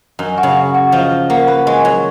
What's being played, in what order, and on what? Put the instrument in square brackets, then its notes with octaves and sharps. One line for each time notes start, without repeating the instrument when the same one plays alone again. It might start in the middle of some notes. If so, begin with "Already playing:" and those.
[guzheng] F#2 [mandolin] D#5
[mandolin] F#4
[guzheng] C#3
[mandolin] F#4
F#4
[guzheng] F3 [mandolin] D#5
[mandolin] D#5
[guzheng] A#3 [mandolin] F#4
[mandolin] B4
[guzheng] G#3 [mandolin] C#5
[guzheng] F#3 [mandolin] C#5